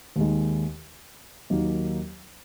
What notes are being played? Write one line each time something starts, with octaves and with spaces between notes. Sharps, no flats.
D#2 D#3 G#3
D#2 D#3 F#3 A#3